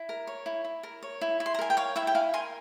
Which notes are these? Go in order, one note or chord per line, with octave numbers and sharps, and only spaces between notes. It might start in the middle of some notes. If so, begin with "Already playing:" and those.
Already playing: E4
A#4
C#5
E4
E4
A#4
C#5
E4
E4
C6
A#5
A#4 G#5
G5
C#5 F5
E4 E5 G5
G5
E4 F5 G#5
A#4 G#5 C6